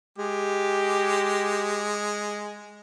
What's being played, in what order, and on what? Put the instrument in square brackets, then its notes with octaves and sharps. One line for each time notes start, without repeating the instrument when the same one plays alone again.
[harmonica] G#3 [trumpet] G4